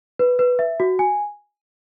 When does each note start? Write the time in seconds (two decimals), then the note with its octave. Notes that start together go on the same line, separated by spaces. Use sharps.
0.19 B4
0.39 B4
0.59 E5
0.80 F#4
0.99 G#5